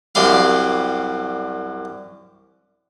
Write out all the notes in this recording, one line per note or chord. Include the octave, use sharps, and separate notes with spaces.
C2 F#2 C3 G3 F5